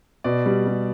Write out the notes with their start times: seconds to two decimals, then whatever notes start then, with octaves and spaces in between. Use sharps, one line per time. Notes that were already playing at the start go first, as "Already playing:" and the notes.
0.24 B2 D5
0.46 G3
0.67 G3